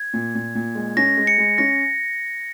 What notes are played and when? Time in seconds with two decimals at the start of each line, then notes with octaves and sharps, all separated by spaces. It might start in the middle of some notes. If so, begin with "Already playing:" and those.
Already playing: G#6
0.13 A#2
0.35 A#2
0.55 A#2
0.75 G#3
0.97 C#4 A#6
1.17 G#3
1.27 C#7
1.38 G#3
1.58 C#4 A#6